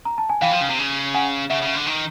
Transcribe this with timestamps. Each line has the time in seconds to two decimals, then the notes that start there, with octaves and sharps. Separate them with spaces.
0.05 A#5
0.18 A5
0.29 G#5
0.42 E3 F5 G5
0.51 F3
0.61 C#3
0.69 C3
0.79 C#3
1.15 F#5 G#5
1.50 C#3 E5 F#5
1.62 C#3
1.75 D3
1.86 D#3